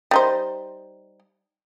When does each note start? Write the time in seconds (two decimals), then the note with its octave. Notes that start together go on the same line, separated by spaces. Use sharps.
0.11 G3 D#4 C5